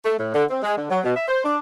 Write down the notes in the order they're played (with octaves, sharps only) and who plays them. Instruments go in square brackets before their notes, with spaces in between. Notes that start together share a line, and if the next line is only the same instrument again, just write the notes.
[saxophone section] A3
A2
D3
C4
G#3
D3
F#3
B2
E5
C5
D4